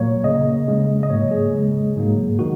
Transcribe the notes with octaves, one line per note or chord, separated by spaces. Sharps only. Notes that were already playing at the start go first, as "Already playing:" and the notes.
Already playing: A#2 F#3 A#3 C#5
C#3 A#3 D#5
C#3 G#3
D#5
G#2 F#3 A#3 C#5
G#4
C#3 G#3
G#2 F#3 A#3
D#3 F#4